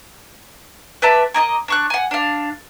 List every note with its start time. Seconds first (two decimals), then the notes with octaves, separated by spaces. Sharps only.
1.02 B4 D5 E5 A5
1.34 A#3 D#5 G#5 D#6
1.68 D4 C#6 F#6
1.90 F#5 G#5
2.11 D4 F5